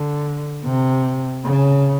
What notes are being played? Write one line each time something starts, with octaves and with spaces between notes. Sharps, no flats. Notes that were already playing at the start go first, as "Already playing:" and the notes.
Already playing: D3
C3
C#3